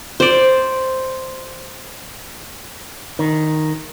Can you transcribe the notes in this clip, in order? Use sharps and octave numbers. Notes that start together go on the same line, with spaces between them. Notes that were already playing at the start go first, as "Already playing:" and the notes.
C5 D5
D#3